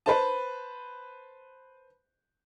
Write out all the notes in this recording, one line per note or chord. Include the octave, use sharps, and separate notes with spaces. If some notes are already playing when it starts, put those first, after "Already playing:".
B4 C5 A5